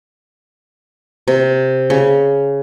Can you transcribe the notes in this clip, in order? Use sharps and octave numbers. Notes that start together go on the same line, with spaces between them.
C3
C#3